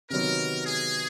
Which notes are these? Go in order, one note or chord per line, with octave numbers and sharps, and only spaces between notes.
C3 D#3 F#3 B3 A#4
G#4